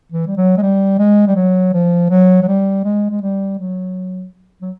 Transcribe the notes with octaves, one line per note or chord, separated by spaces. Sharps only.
E3
G3
F#3
G#3
G3
G#3
G3
F#3
F3
F#3
F#3
G3
G#3
G#3
G3
F#3
F#3